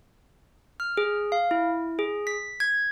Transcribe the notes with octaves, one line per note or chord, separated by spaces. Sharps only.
F6
G#4
F5
E4
G#4
B6
G#6